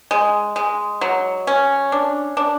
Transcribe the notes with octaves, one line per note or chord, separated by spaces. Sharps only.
G#3
G#3
F#3
C#4
D4
D4